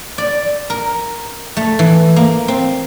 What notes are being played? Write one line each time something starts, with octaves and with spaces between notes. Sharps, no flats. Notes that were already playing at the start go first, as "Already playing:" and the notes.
D5
A#4
A3
E3
A#3
C4